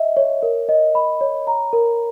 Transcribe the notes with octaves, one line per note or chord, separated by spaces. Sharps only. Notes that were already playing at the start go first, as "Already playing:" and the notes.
Already playing: D#5 E5
C#5
A#4
D#5
B5
C#5
A#5
A#4